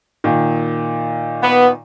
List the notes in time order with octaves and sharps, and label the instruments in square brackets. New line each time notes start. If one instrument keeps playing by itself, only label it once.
[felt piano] A#2 D#3
[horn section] B3